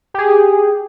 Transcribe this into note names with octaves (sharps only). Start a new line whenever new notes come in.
G4 G#4